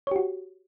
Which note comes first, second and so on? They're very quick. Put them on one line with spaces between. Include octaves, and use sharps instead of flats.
C#5 G4 F#4